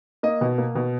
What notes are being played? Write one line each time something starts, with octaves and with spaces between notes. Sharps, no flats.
A#3 D#5
B2
A#3
B2